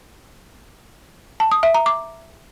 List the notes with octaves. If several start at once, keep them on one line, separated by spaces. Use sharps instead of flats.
A5
D#6
E5
A#5
D6